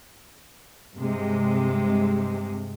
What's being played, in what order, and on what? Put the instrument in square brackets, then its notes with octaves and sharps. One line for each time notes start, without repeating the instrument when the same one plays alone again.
[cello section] G2 C3 G#3